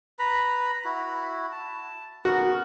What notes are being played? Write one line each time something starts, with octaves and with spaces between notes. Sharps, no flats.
B4 A#5 B5
E4 F#4
A5
B3 F#4 A#4